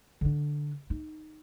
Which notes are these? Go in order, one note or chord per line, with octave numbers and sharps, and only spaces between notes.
D3 D4
D#4